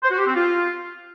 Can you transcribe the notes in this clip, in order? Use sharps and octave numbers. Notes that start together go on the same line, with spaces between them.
C5
F#4
G4
C4
F4